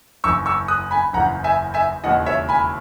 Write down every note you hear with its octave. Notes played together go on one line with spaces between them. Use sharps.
F#1 E2 C#3 E3 C#6 E6
C#6 E6
D#6 F#6
G#5 B5
F#1 E2 C#3 E3 F#5 A#5
E5 G#5
E5 G#5
E1 D#2 C#3 E3 D#5 F#5
C#5 E5
G#5 B5